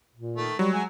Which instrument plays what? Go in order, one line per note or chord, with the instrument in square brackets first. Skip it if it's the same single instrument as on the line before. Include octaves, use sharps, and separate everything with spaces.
[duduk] A#2
[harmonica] D#3 A3
[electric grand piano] F#3 [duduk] G3 [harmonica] C#6
[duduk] G#3 [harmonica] G#5